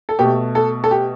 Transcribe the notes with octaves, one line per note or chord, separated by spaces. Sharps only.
A4
B2 A3 G4
A4
A4
G4